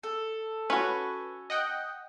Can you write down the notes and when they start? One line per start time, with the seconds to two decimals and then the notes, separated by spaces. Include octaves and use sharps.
0.03 A4
0.70 C#4 F#4 B4
1.50 D#5 F#5 G5